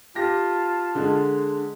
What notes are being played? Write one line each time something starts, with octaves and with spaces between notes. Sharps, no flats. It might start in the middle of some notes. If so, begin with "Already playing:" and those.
F4 G4 A5 A#6
D3 G#3